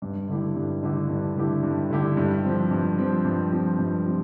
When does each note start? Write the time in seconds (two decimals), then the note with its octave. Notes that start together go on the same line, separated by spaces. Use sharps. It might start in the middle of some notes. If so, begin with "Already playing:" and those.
0.02 G2
0.28 D3 A3 E4 G4
0.55 G2
0.83 D3 A3 E4 G4
1.09 G2
1.36 D3 A3 E4 G4
1.63 G2
1.90 D3 A3 E4 G4
2.17 G2
2.44 F3 C4
2.71 G2
2.98 F3 C4
3.25 G2
3.52 F3 C4
3.78 G2
4.05 F3 C4